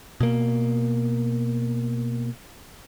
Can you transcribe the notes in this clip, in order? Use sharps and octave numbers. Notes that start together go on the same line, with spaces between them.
B2 A#3